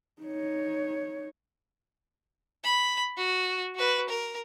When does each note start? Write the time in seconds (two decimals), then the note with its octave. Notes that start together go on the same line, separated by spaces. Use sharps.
0.23 D#4 C#5
2.64 B5
3.17 F#4
3.75 F#4 B4
4.09 A#4